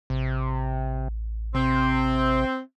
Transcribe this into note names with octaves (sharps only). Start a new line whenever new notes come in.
A1 C3
C3 C4